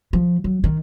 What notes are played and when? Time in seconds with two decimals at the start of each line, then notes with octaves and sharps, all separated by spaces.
0.13 F3
0.44 F#3
0.64 D#3